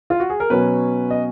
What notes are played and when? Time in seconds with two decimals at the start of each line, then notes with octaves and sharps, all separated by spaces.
0.10 F4
0.20 F#4
0.30 G#4
0.40 A#4
0.50 B2 F#3 C#4 B4
1.11 D#5